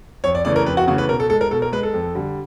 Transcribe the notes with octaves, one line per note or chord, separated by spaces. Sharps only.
F2 C#5
D5
C#3 E3 A3 D5
A#4
F2 B4
F#4
C#3 E3 A3 F#4
B4
B2 A#4
A4
G#3 A4
A#4
B2 A4
A#4
G#3 B4
A4
F2
D3 G3